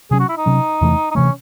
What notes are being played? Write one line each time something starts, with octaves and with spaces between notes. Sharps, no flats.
C3 F#3 C#4 G#4
F#4
E4
D#4
C3 F#3 C#4
E2 C3 E3 A3
D#4
C3 E3 A3 C#4